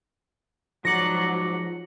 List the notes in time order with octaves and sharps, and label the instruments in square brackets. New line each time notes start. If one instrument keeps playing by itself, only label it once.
[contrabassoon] G#2 [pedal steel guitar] F3 D5 [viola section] F#3 [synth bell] A#6 C#7 F#7